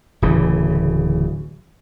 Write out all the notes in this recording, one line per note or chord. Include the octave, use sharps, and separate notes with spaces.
D1 D2 C#3 E3